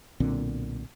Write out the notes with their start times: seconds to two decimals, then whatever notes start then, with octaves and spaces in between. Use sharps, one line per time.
0.20 B1 A#2 D3 C4